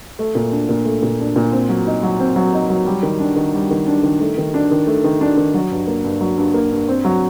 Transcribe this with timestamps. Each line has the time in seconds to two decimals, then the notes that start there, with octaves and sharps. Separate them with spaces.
0.19 A3
0.35 A#2
0.52 D4
0.69 A#2
0.85 A3
1.02 A#2
1.20 D4
1.36 A#2
1.52 C4
1.69 F#3
1.86 D#4
2.03 F#3
2.19 C4
2.36 F#3
2.53 D#4
2.70 F#3
2.86 G3
3.03 D#3
3.19 D4
3.36 D#3
3.53 G3
3.71 D#3
3.87 D4
4.03 D#3
4.20 A3
4.38 D#3
4.54 D4
4.71 D#3
4.87 A3
5.04 D#3
5.21 D4
5.37 D#3
5.54 F#3
5.71 G2
5.87 A#3
6.04 G2
6.21 F#3
6.38 G2
6.54 A#3
6.71 G2
6.88 C4
7.04 F#3